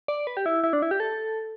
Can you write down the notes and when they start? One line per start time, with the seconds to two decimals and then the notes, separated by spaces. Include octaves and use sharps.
0.08 D5
0.27 B4
0.37 G4
0.46 E4
0.64 E4
0.73 D4
0.82 E4
0.91 G4
1.00 A4